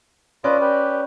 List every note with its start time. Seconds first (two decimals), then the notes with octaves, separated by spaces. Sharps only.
0.44 C#4 F4 B4 D5 D#5
0.61 G4 B4